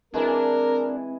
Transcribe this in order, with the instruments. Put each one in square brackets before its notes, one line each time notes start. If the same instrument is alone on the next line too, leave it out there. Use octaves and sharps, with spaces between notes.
[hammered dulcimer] E3 G#3 G#5 [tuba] C4 [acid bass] D4 [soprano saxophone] A#4